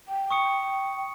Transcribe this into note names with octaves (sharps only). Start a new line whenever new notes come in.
G5
C#6 D#6 C#7